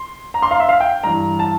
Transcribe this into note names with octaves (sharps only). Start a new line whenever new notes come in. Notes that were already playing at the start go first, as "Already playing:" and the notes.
Already playing: C6
A#5
C6
F5
E5
F5
G5
G2 E3 A#5
A5